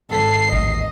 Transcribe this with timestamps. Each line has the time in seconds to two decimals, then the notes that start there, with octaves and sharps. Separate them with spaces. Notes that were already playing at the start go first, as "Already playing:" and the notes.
0.10 G#1 A4 C7
0.52 A1 D#2 D#5